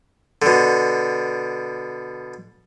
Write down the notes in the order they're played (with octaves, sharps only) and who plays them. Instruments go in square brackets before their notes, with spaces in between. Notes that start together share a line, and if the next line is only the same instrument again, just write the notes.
[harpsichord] B2 D3